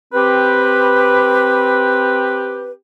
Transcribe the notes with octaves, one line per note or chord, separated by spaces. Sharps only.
C4 G4 B4